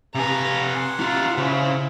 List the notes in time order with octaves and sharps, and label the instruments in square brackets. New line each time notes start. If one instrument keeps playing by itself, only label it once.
[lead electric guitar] C3 G#5 [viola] B4 A#5
[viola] F#5 C6
[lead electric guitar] D#4 F4
[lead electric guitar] C#3 [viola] E4 C5